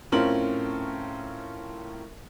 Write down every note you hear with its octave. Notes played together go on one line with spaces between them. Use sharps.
A2 C4 C#4 F4 A#4 F#7